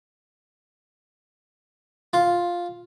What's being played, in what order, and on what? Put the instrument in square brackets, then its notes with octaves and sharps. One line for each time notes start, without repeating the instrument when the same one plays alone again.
[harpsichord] F4